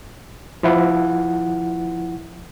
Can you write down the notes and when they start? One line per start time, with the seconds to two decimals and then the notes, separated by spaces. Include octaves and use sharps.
0.63 F3 E4 F#5